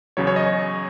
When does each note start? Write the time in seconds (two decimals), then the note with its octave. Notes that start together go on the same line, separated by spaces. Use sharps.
0.17 E2 C#3 F#3 C#5
0.27 C#5
0.36 D#5
0.46 C#5